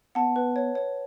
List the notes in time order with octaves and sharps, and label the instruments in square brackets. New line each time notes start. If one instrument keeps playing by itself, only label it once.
[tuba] B3 [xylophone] F#5 A5
[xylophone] B4
C#5
C#5